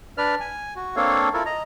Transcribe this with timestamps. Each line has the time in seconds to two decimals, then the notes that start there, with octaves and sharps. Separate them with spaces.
0.18 D4 B4 D5 F6
0.40 G#5
0.76 F#4
0.96 A#3 C4 D4 A4 C#5 F5
1.34 E4 F4 A4 A#4
1.46 D#5 A#5